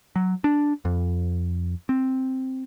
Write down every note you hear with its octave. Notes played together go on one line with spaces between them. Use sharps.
F#3
D4
F2
C4